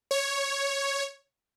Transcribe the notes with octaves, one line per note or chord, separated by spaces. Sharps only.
C#5